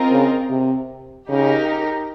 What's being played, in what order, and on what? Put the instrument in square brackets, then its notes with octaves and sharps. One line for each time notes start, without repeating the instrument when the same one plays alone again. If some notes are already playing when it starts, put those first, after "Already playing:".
Already playing: [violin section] C4 F4 A#4 D#5
[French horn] C#3
C3
[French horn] C#3 [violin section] D#4 G4 A#4